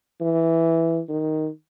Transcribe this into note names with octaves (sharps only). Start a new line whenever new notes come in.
E3
D#3